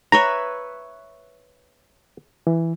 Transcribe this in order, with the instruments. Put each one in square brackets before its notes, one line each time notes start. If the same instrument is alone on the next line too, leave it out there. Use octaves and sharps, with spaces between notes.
[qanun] B4 C#5 E5 [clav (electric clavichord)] A#5
[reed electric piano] E3